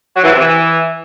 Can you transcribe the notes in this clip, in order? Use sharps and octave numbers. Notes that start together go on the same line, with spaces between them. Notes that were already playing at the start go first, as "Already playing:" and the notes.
F#3
E3
C3
E3